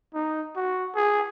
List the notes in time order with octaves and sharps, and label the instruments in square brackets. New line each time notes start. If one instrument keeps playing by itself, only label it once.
[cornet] D#4
F#4
G#4